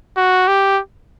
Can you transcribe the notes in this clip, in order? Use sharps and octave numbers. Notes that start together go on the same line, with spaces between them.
F#4
G4